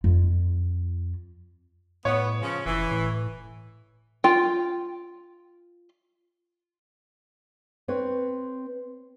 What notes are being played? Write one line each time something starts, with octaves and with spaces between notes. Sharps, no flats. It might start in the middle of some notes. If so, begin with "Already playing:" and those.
F2 F4
A2 B3 C#5
C#3 F3 C#4
F1 E3
A2
F4 G5
C4 B4 C#5